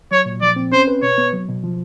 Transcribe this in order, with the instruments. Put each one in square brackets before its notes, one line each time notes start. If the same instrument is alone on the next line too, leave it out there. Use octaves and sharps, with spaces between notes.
[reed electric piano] F#3 [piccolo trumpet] C#5
[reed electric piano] A#2
[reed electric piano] F3 [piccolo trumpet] D5
[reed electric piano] C4
[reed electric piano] C#4 [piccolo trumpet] C5
[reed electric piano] B4
[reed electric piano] B2 [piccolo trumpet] C#5
[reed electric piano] B3
F#3
B2
F3